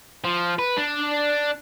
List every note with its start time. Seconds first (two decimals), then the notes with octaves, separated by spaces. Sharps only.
0.25 F3
0.59 B4
0.77 D4